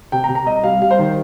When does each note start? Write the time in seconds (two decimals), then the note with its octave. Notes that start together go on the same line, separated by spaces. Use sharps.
0.12 C3 G5
0.24 A#5
0.29 C3
0.35 A#5
0.46 C2 D#5
0.64 G3 F5
0.82 G3 F5
0.91 C5
0.99 D#3